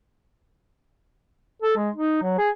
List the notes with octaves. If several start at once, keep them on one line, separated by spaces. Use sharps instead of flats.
A4
G#3
D#4
F#3
G#4